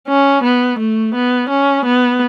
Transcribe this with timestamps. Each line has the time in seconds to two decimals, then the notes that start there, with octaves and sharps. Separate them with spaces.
0.08 C#4
0.44 B3
0.79 A3
1.14 B3
1.49 C#4
1.85 B3